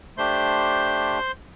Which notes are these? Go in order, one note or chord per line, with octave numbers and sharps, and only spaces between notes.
A3 D4 G4 C5 C6